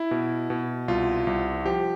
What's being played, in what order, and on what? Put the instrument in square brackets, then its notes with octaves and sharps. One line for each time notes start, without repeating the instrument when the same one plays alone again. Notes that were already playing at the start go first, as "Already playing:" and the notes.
Already playing: [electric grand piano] E4
B2
B2
C2 F4
C2
F3 G4